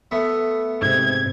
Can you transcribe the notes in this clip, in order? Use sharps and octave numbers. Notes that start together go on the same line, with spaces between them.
A3 B3 E5
G#2 C3 G#6